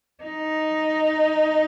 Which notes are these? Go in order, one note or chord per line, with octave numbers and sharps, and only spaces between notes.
D#4